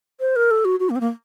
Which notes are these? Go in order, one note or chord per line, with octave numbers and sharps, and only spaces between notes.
C5
A#4
A4
F#4
F#4
A#3
C4
A#3